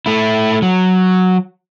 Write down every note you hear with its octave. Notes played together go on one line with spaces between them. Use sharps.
A3 E4
F#3